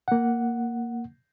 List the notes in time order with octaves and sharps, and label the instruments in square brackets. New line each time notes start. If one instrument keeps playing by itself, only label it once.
[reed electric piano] A#3 F#5